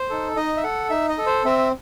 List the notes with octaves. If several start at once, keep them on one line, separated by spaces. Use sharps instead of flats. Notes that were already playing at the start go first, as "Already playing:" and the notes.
Already playing: C5
D#4 A4
D#4 D#5
E5
A4 F#5
D#4 E5
D#5
A4
C5
C4 E5